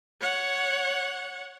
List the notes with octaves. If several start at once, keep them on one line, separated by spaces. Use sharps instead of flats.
C#5 F#5